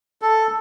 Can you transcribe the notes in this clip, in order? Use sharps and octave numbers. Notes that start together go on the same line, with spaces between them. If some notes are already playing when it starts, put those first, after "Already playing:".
A4